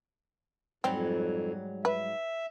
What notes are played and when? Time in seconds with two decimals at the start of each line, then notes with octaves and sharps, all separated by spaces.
0.84 F2 G#2 F#3 G3 C4
1.85 B4 E5